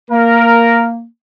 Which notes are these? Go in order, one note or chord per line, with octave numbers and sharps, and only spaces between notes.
A#3 A#4